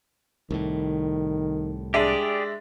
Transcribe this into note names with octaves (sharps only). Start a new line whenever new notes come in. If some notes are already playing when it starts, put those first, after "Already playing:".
C2 A2 D#3
G#3 D4 G4 G#4 D5 E5